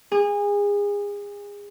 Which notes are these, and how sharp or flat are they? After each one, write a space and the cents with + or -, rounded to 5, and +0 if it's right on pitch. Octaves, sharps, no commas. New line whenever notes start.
G#4 -30